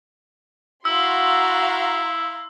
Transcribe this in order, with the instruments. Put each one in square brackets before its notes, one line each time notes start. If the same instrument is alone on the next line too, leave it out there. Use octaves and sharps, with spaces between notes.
[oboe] E4 [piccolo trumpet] F#4 [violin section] F5 A#5 C6 [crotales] E6